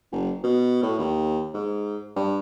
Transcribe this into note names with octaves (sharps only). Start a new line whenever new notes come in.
F#1
B2
A2
D#2
G#2
G2